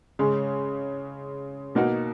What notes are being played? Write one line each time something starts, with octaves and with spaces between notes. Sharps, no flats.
C#3 G#3 C#4
B2 A#3 D#4 F#4